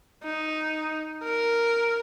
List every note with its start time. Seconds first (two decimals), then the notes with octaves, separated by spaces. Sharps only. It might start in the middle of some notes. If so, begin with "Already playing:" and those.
0.24 D#4
1.24 A#4